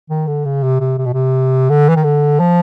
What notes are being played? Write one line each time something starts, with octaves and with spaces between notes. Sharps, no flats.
D#3
D3
C#3
C3
C3
C3
B2
C3
D3
E3
D#3
D3
F3